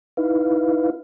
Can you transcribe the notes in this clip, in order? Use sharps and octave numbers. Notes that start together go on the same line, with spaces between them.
D#4 E4 B4 F5